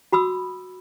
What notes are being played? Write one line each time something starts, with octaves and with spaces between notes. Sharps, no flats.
F#4 B5 D#6 E6